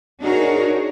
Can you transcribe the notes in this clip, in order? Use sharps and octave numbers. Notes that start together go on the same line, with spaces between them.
D4 D#4 F#4 G#4 A#4 C#5